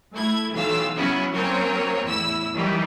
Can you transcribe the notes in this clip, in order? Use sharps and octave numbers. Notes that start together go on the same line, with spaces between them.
A3 E4 G#6
B1 E3 F5 E6
C#3 F#3 B3 C#4 E4 F#4
F#3 A#3 C4 C#4 A#4 C#5
E2 A2 E4 E6
D#3 E3 F#3 G3 D#4